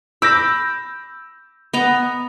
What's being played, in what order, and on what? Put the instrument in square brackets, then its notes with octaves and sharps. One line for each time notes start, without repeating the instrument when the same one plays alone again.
[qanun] B5 D6 [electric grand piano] E6 G6 A#6
[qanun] B3 D#5 A#5